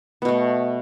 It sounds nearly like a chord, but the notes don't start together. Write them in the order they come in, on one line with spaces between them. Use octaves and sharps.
B3 B2 A3